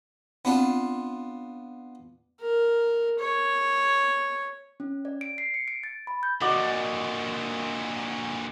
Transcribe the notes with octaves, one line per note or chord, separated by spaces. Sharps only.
B3 C4 D4 F4
A#4
C#5
C#4
D5
D7
C7
C#7
D7
A6
B5
G6
A#2 D3 F#4 D5 D#5